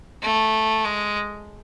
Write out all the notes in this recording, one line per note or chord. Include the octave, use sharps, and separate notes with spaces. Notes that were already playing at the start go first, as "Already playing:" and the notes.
A3
G#3